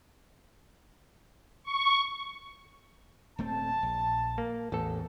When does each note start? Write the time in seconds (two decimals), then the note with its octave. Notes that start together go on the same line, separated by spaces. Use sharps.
1.63 C#6
3.38 D#1 A3 C4 A5
3.83 A#1
4.38 A#3
4.72 A1 E2 A4